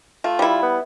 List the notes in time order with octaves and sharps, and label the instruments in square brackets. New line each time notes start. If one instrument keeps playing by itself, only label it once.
[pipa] A3 [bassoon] F4
[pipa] G3 E4
[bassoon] B3